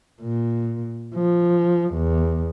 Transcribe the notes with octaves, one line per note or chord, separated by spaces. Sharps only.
A#2
F3
E2